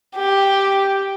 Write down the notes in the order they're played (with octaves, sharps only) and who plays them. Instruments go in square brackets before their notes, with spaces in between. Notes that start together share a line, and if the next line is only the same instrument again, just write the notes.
[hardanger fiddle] G4